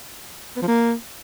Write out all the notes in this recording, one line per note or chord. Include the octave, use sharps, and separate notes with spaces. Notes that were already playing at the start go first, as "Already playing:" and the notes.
B3
F3
A#3